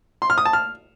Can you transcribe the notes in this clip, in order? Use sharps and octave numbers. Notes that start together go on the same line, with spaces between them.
C6
F6
D#6
A5
F6